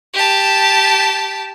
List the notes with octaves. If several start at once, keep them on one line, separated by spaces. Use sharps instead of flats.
G4 A5